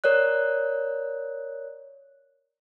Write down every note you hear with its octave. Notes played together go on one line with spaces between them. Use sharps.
A#4 C#5 D5 F#6